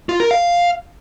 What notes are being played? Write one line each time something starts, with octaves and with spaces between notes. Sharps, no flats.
F4
A#4
F5